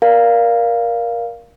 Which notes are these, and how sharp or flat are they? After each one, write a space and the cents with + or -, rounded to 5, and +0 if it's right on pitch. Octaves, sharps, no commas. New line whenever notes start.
A#4 +15 D5 +0 F5 +0